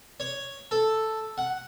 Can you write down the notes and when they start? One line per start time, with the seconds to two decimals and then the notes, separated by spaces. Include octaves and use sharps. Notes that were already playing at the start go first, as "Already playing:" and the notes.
0.20 C#5
0.71 A4
1.38 F#5